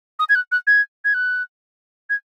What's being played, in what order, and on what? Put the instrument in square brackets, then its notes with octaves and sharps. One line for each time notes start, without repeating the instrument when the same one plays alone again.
[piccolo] D#6
G#6
F#6
F#6
G#6
G#6
F#6
G#6